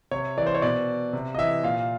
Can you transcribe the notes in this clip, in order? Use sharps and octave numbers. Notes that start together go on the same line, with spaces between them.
C3 C#5
E3 D5
C5
C#5
B2 D5
C3
D#5
E3 E5
A#2 F5